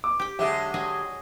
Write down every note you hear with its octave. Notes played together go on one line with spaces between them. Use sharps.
D6
G4 G5
D3 F#3 G#3 G4 E5
F#3 G#4 D#5